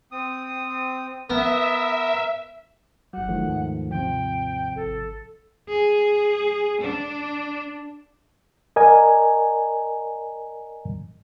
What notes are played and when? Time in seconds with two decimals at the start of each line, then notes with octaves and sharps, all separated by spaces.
0.12 C4 D#6
1.30 B3 A#4 E5
3.13 G1 F#3 F#5
3.29 D#3 F3 A3
3.48 D#2 G#2
3.91 C3 F3 G5
4.76 G#1 A4
5.69 G#4
6.81 D4
8.76 A#4 D5 D#5 G#5 A#5